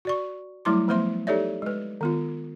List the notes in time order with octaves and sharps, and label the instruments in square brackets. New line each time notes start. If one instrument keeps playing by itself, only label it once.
[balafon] F#4 D5 C#6
F#3 G3 A3 E4 C6 D6
F3 A3 B3 C5 E5 C6
D#4 G4 A4 C#5 D5 E5
G#3 B4
D#3 B3 F4